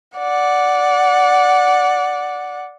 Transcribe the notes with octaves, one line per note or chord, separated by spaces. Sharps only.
D5 F#5